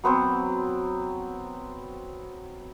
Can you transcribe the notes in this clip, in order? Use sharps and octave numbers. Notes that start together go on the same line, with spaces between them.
F#3 B3 C4 C5